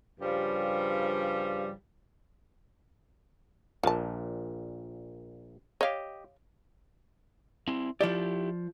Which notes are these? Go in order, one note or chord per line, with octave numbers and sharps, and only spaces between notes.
G2 C#3 F3 G3
A#1 A#2 F4 A5
G4 C#5 D#5 F5
C4 E4
F3 E4 G4 D5